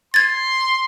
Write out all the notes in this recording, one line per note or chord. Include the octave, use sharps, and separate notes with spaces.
C6 G#6 A6